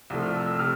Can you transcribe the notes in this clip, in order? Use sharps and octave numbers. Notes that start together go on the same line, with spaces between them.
C2 C3 F3 A3
F6
E6
E6
C3 F6